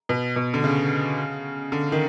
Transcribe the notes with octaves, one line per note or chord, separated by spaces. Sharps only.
B2
B2
D3
C#3
D3
D#3